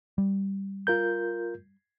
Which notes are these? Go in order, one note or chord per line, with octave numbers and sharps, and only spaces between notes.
G3
F4 A#4 G6